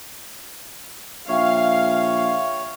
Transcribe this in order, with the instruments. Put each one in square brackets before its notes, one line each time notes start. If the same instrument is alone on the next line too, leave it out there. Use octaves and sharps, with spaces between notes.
[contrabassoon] A#1 [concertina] C#5 [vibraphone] E5 G5 C#6 [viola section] F5